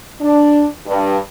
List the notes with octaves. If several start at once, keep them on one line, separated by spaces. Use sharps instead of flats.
D4
G2